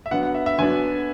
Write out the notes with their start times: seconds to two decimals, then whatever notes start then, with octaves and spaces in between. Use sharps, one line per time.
0.06 E5
0.11 D3 F#3 B3 D4 F#5
0.23 F#5
0.35 E5
0.46 E5
0.58 D3 F#3 B3 D4 G#5